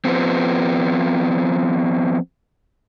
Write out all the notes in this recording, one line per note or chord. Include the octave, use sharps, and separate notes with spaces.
F3 B3 C4